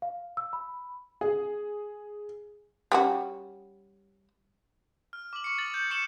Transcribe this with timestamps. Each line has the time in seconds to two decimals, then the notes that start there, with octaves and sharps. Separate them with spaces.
0.02 F5
0.37 E6
0.53 B5
1.21 G#4
2.92 G3 C#4 F#4
5.13 F6
5.33 D6 F#7
5.44 C#6 C#7
5.58 D#6 A6 F#7
5.74 G6 A6
5.91 C#6 C#7 E7 F#7 G7